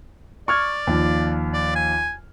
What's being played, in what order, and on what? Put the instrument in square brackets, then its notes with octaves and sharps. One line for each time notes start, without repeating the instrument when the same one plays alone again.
[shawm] D5 [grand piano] C#6 F6 G#6
[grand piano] D#2 F3
[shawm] D5
G#5